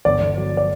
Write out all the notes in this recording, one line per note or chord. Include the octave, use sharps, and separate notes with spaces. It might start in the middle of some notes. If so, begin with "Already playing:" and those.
G1 D5
G1
F#3
F#3 D5